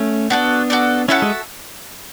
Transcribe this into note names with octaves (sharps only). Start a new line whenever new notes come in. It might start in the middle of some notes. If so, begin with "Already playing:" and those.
Already playing: A3 C#4
B3 D4 F#4 A4 D5
F#4 A4 D5
C#4 E4 F#4 A4 E5 A5
G#3